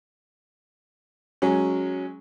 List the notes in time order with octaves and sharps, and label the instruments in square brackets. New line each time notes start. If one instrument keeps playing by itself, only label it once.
[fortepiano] F#3 G#3 C#4